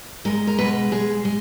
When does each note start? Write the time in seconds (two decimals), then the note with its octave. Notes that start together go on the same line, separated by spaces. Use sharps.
0.25 B2 G#3 A#4
0.47 A#4
0.58 B2 G#3 B4
0.92 B2 G#3 G#4
1.25 G#3